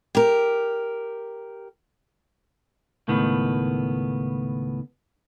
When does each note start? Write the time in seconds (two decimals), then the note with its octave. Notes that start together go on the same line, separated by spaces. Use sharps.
0.15 G4 A#4
3.08 C#2 A2 D#3 B3